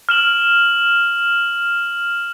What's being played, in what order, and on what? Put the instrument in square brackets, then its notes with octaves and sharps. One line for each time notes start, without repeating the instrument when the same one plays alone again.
[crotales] F6 E7 F#7